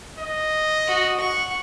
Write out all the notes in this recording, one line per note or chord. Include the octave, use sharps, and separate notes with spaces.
D#5
F#4
F#5 C#6